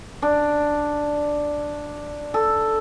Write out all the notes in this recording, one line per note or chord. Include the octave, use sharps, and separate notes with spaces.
D4
A4